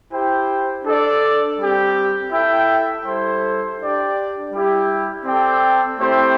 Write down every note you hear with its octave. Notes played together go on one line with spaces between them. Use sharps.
E4 G4 C5 G5
D4 A4 D5
G3 C4 G4
E4 A4 E5 G5
G3 E4 A4 C5
D4 G4 D5 G5
G3 E4 G4
C4 A4 D5 G5
A3 C4 E4 G4 C5